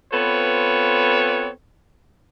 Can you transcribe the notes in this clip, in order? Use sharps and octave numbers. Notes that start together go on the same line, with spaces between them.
B3 C4 F4 A4 B4 C#5